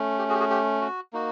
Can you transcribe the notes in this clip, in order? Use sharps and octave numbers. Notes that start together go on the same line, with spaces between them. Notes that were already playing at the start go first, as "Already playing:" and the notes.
Already playing: A3 C#4
G4
F#4 G#4
G4
F#4 G#4
G4
F#4
A#3 D#4 F#4